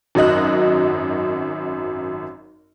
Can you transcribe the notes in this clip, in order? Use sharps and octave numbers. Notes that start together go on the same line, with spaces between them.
G#1 F#2 F#3 D#5 F#6